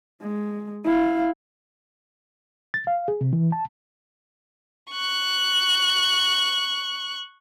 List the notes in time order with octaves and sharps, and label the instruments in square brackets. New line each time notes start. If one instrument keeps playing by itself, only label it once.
[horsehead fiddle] G#3
E4 F5
[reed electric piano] A6
F5
G#4
C3
E3
A5
[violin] C#6 F#6